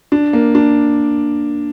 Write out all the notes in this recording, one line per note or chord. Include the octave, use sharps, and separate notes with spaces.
D4
A#3
D4